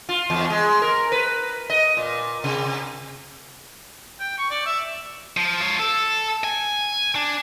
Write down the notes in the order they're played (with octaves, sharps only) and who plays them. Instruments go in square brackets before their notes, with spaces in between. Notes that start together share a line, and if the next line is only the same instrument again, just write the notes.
[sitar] F4
E2
G#3
A#4
B4
D#5
A#2
C3
[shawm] G5
C#6
D5
E5
[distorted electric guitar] F3
F4 C#5
A4
G#5
D4